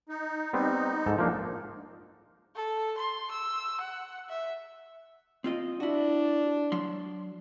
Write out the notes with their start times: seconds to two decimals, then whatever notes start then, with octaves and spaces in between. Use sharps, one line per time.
0.09 D#4
0.53 G3 B3 C4 D#4
1.06 G#2 A4
1.18 F3 A#3 D4
2.56 A4
2.98 C6
3.32 E6
3.81 F#5
4.29 E5
5.44 C4 F4 D#5
5.80 D4 E4 F#4
6.72 F#3 C6